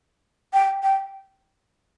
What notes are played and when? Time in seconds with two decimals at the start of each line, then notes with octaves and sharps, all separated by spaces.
0.53 G5
0.83 G5